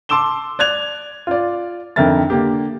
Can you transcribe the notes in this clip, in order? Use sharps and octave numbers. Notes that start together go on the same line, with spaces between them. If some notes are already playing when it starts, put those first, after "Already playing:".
A5 C6 D6 E6 E7 G7
D5 F#6 G#6 F7
F4 D5
F2 D3 D#3 A#4 E5 A6
D3 A#3 G4